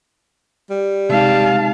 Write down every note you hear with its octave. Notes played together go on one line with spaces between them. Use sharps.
G3
C3 G#3 D#4 F5 A5